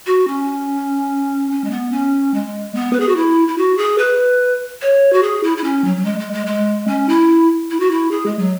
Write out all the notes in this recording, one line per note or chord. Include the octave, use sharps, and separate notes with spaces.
F#4
C#4
C#4
G#3
B3
C#4
G#3
B3
B4
G#4
F#4
E4
E4
F#4
G#4
B4
C#5
F#4
G#4
E4
E4
C#4
F#3
F#3
G#3
G#3
G#3
G#3
C#4
E4
E4
F#4
E4
G#4
G#3
F#3